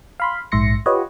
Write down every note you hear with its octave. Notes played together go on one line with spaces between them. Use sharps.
F5 B5 C6
A#1 G#2 E5 C6 A#6 C#7
F4 G4 B4 C#5 D#5 F#5